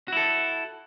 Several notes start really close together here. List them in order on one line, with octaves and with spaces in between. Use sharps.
F#4 E4 A4